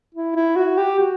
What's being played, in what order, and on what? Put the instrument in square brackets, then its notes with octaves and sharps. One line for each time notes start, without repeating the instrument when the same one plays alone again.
[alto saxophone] E4
E4
F#4
G4
F#4